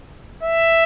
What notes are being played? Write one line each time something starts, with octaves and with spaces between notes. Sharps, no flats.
E5